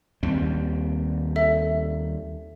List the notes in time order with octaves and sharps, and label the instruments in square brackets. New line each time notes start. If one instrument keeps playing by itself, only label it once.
[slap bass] D#2 G3 C4
[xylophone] A4 E5